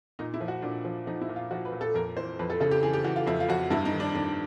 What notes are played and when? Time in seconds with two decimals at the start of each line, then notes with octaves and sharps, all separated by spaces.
0.19 A#2 D#4
0.34 E4
0.41 F3
0.48 F#4
0.62 A#2 D4
0.84 F3
1.07 F3 D#4
1.21 E4
1.29 A#2
1.36 F4
1.51 F3 F#4
1.65 B4
1.72 A#2
1.81 A4
1.94 F2 A#4
2.17 E3 C5
2.39 F2 B4
2.50 A4
2.60 C#3 A4
2.71 G4
2.83 E3 G#4
2.93 G4
3.04 E3 F#4
3.16 F4
3.26 F2 E4
3.40 F4
3.49 F2 F#4
3.70 G2 E4
3.85 D#4
3.93 D#3
4.00 D4
4.15 D#3 D4